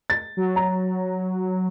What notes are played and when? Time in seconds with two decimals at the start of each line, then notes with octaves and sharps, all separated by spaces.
0.10 A6
0.37 F#3
0.56 A#5